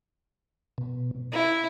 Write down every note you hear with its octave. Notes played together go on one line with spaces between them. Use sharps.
B2
E4